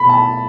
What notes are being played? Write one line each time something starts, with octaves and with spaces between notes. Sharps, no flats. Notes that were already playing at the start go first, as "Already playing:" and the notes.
Already playing: B2 B5
A5